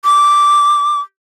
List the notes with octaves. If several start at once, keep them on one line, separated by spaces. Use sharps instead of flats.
D6